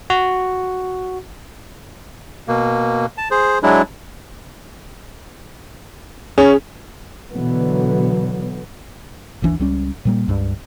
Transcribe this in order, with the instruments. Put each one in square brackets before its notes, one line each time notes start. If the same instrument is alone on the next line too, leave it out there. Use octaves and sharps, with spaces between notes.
[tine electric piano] F#4
[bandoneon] B2 A#3
A5
G#4 C5
F#3 G#3 D4 E4
[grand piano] C#4 [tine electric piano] G#4
[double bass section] B2 D3 E3 F#3 B3
[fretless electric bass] G1 D#2 E3 D4
C#2 G3 C#4
A#2 G3 A#3
C#2 G2